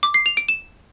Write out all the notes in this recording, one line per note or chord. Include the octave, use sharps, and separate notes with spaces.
D6
C7
F7
D7
E7